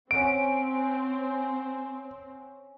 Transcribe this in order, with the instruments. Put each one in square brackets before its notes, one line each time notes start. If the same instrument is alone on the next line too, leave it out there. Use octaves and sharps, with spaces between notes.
[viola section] C4 [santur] C#4 F#5 [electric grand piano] D7